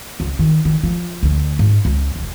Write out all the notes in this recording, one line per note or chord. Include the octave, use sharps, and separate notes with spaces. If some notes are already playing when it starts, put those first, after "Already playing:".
C#2
D#3
D#3
F3
D2
G#2
C#2
E1